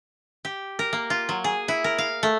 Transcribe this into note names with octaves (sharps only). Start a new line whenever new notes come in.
G4
A#4
A#3
F4
F#3
G#4
E4
A#4
F5
A3